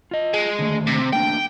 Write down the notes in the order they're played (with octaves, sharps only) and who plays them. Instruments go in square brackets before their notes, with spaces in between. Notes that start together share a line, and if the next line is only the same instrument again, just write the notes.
[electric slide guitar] F4 D#5
[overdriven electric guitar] G#3
[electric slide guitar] D3 D#3 A3
[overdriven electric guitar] C3
[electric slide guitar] A3 A#3 D4 [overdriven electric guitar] G5